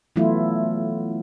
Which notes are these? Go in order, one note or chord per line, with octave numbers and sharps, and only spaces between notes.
E3 F#3 A3 B3 E4 F4